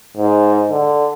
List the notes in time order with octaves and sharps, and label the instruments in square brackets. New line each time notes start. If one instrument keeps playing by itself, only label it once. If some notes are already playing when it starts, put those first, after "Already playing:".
[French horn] G#2
D3